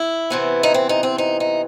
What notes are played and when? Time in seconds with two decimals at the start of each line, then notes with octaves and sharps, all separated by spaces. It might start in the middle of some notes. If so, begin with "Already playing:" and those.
Already playing: E4
0.30 C3 E3 B3
0.63 D#4
0.74 C4
0.89 D#4
1.03 C4
1.18 D#4
1.40 D#4